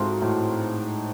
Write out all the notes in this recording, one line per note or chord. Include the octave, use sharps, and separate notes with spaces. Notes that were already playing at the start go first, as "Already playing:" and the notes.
Already playing: G#2 F#3 A3 C4 F4
A2